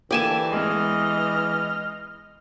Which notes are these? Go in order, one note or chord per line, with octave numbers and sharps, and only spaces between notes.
D3 E3 A#3 G4 D5 G#5 A5
G#3 B3 D#5 F6